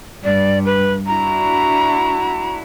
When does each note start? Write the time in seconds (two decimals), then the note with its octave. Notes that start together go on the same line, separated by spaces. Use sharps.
0.24 G2 D5
0.65 B4
1.07 D4 E4 F#4 A#5